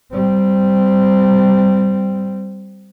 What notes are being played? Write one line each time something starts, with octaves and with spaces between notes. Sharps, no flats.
G3 C4